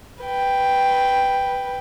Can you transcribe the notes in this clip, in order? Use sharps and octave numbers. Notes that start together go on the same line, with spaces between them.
B4 G5